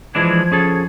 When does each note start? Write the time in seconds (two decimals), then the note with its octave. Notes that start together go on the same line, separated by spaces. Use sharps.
0.15 E3 F3 G#3 D4 G#6
0.52 C#4 G#4 A4